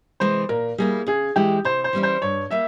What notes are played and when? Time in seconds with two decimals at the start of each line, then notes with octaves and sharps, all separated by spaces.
0.20 C3 E3 G#3 C5
0.49 A#2 A#4
0.78 G3 A#3 E4 G#4
1.07 C#3 G#4
1.36 E3 G#3 E4 G4
1.65 C3 C5
1.84 C5
1.93 E3 G3 C#4 E4
2.03 C5
2.22 G2 C#5
2.51 G3 A#3 E5